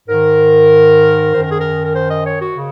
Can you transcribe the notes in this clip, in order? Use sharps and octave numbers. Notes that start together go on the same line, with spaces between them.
G#2 D#3 A#4
F#2 D#3 C5
A#4
G#4
A#4
A#4
C5
D#5
C#5
F#4
C#3